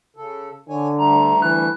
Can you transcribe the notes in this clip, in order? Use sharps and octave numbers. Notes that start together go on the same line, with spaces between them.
C#3 A4
D3 C#5 G#5
D2 G3 A3 A#5
E3 F#6